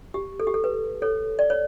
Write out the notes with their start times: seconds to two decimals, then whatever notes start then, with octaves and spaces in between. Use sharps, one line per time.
0.14 G4
0.40 A4
0.47 G4
0.54 A4
0.64 B4
1.02 A4 C#5
1.39 D5
1.50 C#5